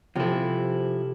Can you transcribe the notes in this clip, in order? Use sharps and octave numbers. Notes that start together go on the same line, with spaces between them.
C3 F3 E4 A4